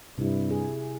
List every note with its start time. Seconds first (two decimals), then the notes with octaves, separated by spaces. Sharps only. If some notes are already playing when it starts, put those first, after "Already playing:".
0.18 G2 C3 E4
0.50 G#4